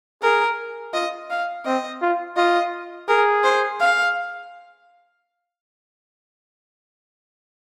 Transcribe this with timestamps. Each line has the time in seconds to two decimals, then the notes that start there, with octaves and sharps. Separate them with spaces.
0.22 G#4 A#4
0.94 F4 D#5
1.30 F5
1.65 C4 D#5
2.02 F4
2.37 F4 D#5
3.08 G#4 A#4
3.44 C5
3.80 F5